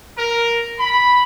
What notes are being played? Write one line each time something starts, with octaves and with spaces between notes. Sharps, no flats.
A#4
B5